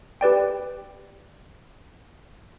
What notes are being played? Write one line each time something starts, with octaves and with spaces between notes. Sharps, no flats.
G4 B4 D5 G5